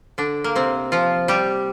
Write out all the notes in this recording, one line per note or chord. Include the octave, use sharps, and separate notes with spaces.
D3 D4
A#3
C3 C4
F3 F4
G3 G4